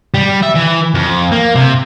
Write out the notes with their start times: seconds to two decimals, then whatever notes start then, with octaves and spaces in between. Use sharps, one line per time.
0.14 G3
0.42 E5
0.55 E3
0.95 F2
1.32 A#3
1.55 C3